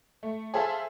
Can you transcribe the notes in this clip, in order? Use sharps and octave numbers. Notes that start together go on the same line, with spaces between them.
A3
G#4 A4 C5 E5 F5 A5